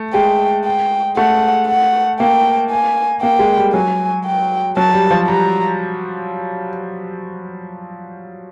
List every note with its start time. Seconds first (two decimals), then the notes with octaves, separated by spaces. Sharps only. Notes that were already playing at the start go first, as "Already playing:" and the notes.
Already playing: A3
0.13 G#3 G5
0.65 G5
1.17 A3 F#5
1.68 F#5
2.20 A#3 G5
2.70 G#5
3.22 A#3 G5
3.39 G#3
3.57 G3
3.73 F#3 G#5
4.25 G5
4.77 F#3 A5
4.94 G3
5.11 F3
5.28 G3 A#5